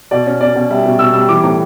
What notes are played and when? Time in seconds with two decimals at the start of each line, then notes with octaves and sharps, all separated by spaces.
0.11 B2 D5
0.27 C#4
0.41 C#4 D5
0.55 B2
0.71 G3 E5
0.85 B2
0.99 B2 E6
1.14 G3 E6
1.29 E3 D6
1.44 A2